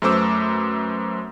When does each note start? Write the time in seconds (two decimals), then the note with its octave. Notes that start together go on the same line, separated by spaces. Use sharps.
0.02 F#2 A3 B3 C5 D6 E6